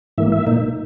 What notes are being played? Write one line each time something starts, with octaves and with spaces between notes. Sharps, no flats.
G#2 E3 A#3 E5
E5
A#2 A#3 D#4